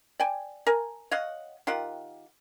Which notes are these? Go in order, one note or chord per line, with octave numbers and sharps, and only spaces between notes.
D5 G5 G#5
A#4 G#5
C#5 D#5 F5 F#5
D#3 F4 G4 F#5